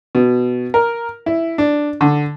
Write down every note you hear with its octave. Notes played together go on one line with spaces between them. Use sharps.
B2
A#4
E4
D4
D3